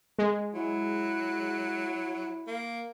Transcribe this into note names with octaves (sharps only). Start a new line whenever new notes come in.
G#3
F#3 E4
A#3